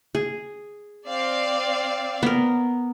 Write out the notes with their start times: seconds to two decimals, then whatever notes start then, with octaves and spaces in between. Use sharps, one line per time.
0.15 G#4
1.08 C4 D5 F5
2.23 B3 A#4